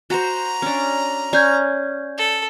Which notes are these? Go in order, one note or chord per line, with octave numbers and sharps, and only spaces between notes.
F#4 C5 A#5
C#4 D4
C#4 D5 F5 G#5 G6 G#6
A4